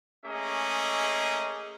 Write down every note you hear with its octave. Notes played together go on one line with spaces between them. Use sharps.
A3 A#3 C#4 G#4 D#5